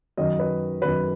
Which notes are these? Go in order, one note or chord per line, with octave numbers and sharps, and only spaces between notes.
F#2 D#3 F#3 D#5
B4
F#2 D#3 F#3 B4